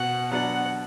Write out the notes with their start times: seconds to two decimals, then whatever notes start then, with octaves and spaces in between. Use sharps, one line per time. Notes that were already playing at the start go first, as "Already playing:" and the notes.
Already playing: B2 F#5
0.31 F#3 B3 D4 F#5